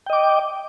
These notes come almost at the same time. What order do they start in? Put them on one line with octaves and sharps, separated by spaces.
G5 D#5 D6